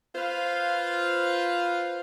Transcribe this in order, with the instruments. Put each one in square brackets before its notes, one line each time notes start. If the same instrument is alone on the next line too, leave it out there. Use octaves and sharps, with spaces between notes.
[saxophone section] F4 B4 C5 F5